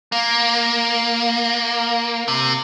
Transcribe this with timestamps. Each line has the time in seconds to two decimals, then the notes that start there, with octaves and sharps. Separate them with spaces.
0.12 A#3
2.28 C3